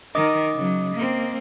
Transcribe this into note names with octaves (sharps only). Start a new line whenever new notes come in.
D#3 A#4 D#5 D6 D#6
C#3 F#3
A#3 C4